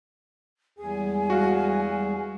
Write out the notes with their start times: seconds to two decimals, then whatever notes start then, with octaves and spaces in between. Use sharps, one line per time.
0.78 E2 G3 G#3 G#4 G#5
1.30 F#4 F5